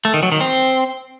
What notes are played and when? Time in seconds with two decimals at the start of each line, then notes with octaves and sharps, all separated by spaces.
0.05 A3
0.14 D#3
0.23 F#3
0.32 D#3
0.41 C4